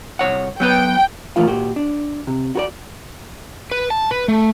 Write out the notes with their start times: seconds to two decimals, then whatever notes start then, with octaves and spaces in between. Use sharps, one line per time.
0.19 C2 C#5 F#5
0.60 F#3 B3 B4 G5
1.36 A2 E3 A3 A#3 F4 F5
1.47 A#2 F#4 G4
1.76 D4
2.27 C3
2.55 F#4 A#4 D5
3.71 B4
3.90 A5
4.11 B4
4.28 A3